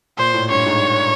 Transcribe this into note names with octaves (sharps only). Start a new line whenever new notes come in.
A#2 C5
A2
G2 C#5
G#2